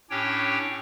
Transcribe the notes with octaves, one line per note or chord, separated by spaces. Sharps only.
A2 C#4 D4 G4 C#5 G5